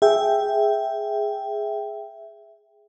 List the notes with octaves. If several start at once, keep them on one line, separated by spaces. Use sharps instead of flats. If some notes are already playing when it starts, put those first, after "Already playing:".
G#4 E5 G5